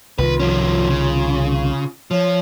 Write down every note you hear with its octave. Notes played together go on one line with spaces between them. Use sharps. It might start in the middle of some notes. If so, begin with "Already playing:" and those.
C2 D#3 F4 B4
F3 C#4
C#3
F3 C#5